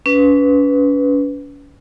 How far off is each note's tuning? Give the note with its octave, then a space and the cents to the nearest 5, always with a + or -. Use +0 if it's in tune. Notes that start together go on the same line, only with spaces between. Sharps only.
C#4 +40 B4 +0